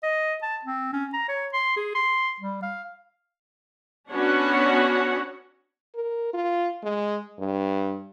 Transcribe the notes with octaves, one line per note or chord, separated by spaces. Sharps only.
D#5
A5
C4
C#4
A#5
C#5
C6
G#4
C6
G3
F5
B3 C#4 D4 F#4 C#5 F#5
A#4
F4
G#3
G2